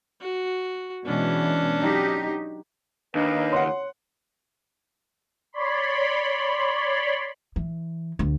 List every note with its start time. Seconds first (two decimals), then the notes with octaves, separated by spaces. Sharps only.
0.21 F#4
1.06 B2 E3 G#3 C#4 D4
1.78 F#3 D#4 G4
3.15 D#2 D4 B4 D#5 F5
3.53 C#5 F#5 C6
5.53 C#5 D5 B5 C6
7.56 E3
8.19 D2